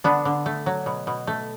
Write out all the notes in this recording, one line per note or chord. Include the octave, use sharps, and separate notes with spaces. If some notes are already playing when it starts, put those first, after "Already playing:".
D3 B3 D4
D3
A3
F#3
B2
B2
A3